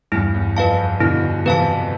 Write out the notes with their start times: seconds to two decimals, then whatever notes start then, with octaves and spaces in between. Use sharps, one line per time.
0.12 E2 G2 E4
0.34 E2
0.57 F2 B4 F5 A5
1.00 B2 D3 E4
1.45 C3 E3 B4 F5 A5